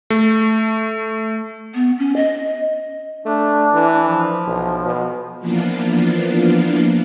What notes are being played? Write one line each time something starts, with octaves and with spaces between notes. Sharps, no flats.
A3
B3
C#4
D#5
A3 D4
E3
F3
B1
B2
E3 F3 A#3 B3 D4 F4